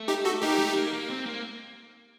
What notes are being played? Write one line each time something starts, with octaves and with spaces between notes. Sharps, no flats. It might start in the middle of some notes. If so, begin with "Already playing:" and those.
Already playing: A3
D#4 G4
F#4 A4
A#3 D#4 G4
A3
A#3
A#3
C4
A#3